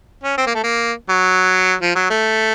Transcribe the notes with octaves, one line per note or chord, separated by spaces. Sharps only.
C#4
C4
A#3
A3
A#3
F#3
F3
F#3
A3